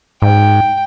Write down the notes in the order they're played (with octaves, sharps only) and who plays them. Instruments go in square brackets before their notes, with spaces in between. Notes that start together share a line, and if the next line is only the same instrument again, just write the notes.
[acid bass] G#2 [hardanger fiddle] G5